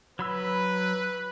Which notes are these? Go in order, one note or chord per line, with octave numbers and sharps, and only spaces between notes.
F#3 B4 B5 E6